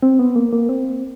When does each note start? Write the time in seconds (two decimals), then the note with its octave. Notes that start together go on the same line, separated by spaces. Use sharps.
0.03 C4
0.19 B3
0.36 A#3
0.53 A#3
0.69 C4